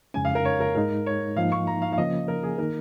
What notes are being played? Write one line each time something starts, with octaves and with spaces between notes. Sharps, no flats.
F2 C#3 G#3 C#4 G#5
F5
A#4
C#5
A#4
G#2 G#3 D#4 A#4
C#5
G#2 F3 A#3 D#4 F5
C#6
A#5
F5
F5
C#3 F3 A#3 C#4 D#5
A#4
G#4
D#3 A#3 D#4 A#4